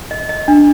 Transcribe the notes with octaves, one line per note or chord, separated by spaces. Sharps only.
D#5
D#5
D4